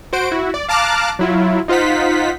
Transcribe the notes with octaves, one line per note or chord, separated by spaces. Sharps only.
F#4 C5 D7
E4 F#4
D5
F5 A5 A#5 D6 F6 F#6
F#3 E4 F4
D#4 F4 C5 F#5 B6